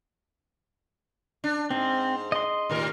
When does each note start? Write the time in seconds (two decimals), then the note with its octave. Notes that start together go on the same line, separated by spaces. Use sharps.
1.44 D4
1.70 G#2 C4
2.32 D#5 C6
2.70 D#2 A2 A#4